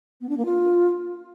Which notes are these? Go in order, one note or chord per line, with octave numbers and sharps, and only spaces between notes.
B3
D4
A#3
F4